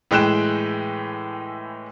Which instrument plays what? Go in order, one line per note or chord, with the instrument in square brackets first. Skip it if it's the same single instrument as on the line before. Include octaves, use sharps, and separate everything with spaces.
[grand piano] A2 E3 G#3 G5 F#6 E7